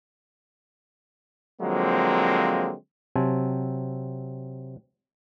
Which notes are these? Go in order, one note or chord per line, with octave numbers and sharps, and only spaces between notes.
D3 F3 F#3 G#3 A#3 C4
C3 F#3 C4 G#5 A5